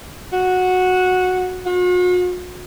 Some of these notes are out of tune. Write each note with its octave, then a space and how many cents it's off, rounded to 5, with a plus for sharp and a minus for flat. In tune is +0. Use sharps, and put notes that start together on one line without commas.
F#4 -10
F#4 -45